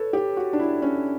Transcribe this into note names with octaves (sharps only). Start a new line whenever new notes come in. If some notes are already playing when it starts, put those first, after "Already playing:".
Already playing: A4 B4 C#5
G4
F#4
D4
E4
C#4